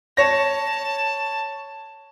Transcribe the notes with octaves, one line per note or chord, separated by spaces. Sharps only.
C#5 A5 A#6